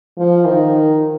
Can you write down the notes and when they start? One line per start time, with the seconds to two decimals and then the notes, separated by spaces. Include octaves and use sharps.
0.18 F3
0.46 D#3